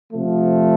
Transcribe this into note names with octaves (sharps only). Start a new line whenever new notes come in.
C3 F3 A3